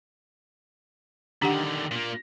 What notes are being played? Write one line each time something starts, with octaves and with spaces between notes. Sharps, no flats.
D3 D#3 D4 G4 F#5
A#2 A#3